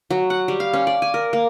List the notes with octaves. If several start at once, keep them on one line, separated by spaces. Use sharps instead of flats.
F#3
F#5
G3
F5
C#4
D5
G#5
A#4
A#3